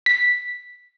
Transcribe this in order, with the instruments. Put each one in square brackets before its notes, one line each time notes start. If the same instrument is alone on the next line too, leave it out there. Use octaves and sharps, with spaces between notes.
[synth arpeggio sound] B6